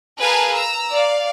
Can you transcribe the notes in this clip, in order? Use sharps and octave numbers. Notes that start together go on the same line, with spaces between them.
G#4 A#4 B4 F5 G#5 A5
A#5 E6
D5 F5